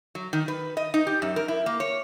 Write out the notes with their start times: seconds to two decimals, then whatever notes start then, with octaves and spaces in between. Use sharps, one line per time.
0.15 F#3
0.33 D#3
0.48 B4
0.77 D#5
0.94 D#4
1.07 G4
1.22 F#2
1.36 A#4
1.48 E4
1.66 A#3
1.80 C#5